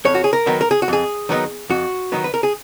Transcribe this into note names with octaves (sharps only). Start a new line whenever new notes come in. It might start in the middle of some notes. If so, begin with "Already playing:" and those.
F2 C#5
F#4
G#4
A#4
D#3 F#3 B3 D#4
A#4
G#4
F#4
F2 G#4
D#3 F#3 B3 D#4
F2 F#4
D#3 F#3 B3 D#4
B4
A#4
G#4